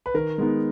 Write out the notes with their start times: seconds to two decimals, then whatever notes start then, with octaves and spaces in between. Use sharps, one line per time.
0.06 B4
0.14 D#3 A#4
0.38 G#3 B3 D#4